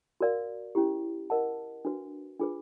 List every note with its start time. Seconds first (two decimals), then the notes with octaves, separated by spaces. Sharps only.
0.20 F#4 A#4 D5 F5
0.75 C#4 E4 G4
1.30 A#4 D#5 F#5 A5
1.85 D4 F#4 B4
2.40 D4 F4 G#4 B4